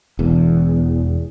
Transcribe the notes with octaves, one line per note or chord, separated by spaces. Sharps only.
E1 E2